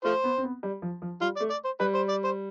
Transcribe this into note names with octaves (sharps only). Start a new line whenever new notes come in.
A3 F4 C5
B3
C4
B3
G3
F3
F3
G3 F4
D5
A3
D5
C5
G3 B4
C5
D5
C5